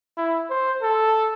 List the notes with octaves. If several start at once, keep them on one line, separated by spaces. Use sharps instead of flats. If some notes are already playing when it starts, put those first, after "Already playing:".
E4
C5
A4